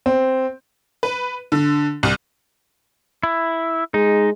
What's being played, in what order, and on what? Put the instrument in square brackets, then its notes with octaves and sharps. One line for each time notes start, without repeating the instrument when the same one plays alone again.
[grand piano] C4
[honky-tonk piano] B4
D3
C2
[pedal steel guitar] E4
[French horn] G#3 [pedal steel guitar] D#4